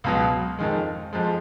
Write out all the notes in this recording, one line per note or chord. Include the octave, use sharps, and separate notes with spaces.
C#2 B2 F#3 F5
F2 D#3 G#3
F2 F3 G#3